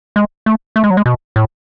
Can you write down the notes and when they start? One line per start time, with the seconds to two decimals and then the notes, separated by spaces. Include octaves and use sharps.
0.16 G#3
0.46 A3
0.76 A3
0.84 G#3
0.90 F#3
0.97 G#3
1.06 B2
1.36 A2